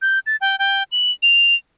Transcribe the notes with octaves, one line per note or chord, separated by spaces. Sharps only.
G6
A6
G5
G5
F#7
F7